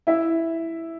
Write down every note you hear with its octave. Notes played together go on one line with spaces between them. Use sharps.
E4 E5